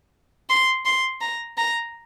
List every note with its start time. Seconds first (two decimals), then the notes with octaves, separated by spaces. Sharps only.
0.50 C6
0.86 C6
1.21 A#5
1.58 A#5